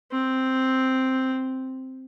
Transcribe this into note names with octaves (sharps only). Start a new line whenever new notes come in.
C4